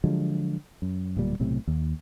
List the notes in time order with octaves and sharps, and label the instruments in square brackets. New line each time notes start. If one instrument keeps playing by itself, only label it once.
[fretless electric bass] D3 F3 F#3 G#3
F#2
D1 A#2 G3
B1 A2 C3
D#2